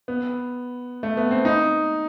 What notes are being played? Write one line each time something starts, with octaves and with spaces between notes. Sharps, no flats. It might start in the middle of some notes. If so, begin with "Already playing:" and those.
B3
A3
B3
C4
D#4